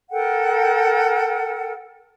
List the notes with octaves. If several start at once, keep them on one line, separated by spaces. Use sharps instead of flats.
A4 A#4 F#5 G5